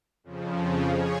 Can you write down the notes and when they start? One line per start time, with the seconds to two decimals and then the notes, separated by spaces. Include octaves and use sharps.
0.24 F2 C#3 F3
0.88 G#4 C#5